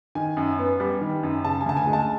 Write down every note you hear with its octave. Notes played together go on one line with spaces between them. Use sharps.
D#3 G#5
F#2
B3
G3
D#3
F#2
C#3 A5
G#5
D2 A5
G#5
G#3
A5